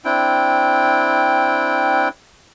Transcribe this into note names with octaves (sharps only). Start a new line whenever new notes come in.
C4 D4 E4 G5